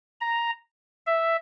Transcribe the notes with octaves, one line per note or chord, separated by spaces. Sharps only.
A#5
E5